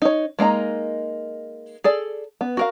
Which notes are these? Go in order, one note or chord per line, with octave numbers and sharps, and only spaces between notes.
D#4 C#5
G#3 A#3 D#4 A#5
G#4 A4 D5
B3
F#4 A#4 F5